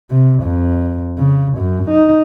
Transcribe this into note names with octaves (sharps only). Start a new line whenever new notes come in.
C3
F2
C#3
F#2
D#4